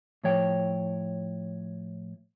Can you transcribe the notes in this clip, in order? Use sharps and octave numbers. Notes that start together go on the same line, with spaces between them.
A2 F3 C#5 G5